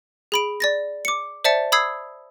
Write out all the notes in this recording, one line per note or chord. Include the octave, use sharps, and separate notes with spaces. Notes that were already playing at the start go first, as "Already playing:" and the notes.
G#4 B5 D7
D5 A6 A#6
D6 C#7
C5 D5 E5 A5 A6 C#7
B5 D#6 E6 G#6 C7